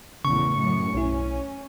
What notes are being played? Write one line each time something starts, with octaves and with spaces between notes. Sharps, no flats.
A#1 E2 A2 C#3 C#6
F#2 A2 C#7
B1 C#4 E4